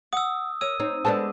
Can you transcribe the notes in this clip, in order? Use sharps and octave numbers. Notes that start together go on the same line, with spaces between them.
F#5 D#6 E6
A#4 C#5 E6 D#7
C4 D#4 C#5
G#3 B3 D4 A4 C5 A5